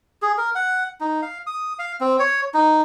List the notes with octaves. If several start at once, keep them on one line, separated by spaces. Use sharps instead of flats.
G#4
A#4
F#5
D#4
F5
D#6
F5
C4
C#5
D#4